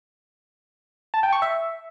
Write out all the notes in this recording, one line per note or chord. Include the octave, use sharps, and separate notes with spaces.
A5
G5
C#6
E5